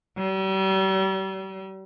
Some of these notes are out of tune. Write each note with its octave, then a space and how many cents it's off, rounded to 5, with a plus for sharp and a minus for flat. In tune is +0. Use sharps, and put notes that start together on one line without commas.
G3 -40